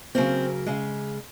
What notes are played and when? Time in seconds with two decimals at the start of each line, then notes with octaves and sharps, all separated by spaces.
0.15 C#3 F#3 A#3 C4
0.66 C#3 G#3